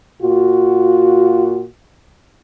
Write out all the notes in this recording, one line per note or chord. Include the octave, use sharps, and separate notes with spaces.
A#2 F4 F#4